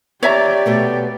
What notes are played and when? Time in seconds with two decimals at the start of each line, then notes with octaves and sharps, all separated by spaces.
0.23 G4 C#5 D5 E5 A#5
0.66 B2 A3 B3